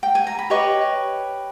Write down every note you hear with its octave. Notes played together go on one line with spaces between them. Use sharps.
G5
G#5
A#5
B5
G4 B4 C#5 D#5 C#6